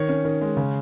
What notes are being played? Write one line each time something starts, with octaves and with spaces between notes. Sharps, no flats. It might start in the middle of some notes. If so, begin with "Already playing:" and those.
Already playing: D#3 C#5
C#4
D#3
G#3
C#3